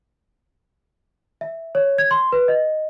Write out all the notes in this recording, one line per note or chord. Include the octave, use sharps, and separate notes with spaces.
E5
C#5
G#6
C6
B4
D#5